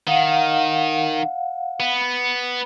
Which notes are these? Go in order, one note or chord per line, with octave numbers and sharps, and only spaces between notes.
D#3 F5 F#5
B3